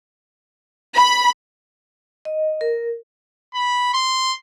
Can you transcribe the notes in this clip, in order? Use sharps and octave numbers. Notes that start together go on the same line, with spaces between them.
B5
D#5
A#4
B5
C6